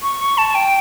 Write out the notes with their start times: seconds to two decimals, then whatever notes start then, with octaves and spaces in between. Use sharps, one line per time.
0.03 C#6
0.20 C#6
0.38 A5
0.49 A5
0.55 G5